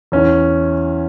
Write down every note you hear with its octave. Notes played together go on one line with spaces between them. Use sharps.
E2 E3 C#4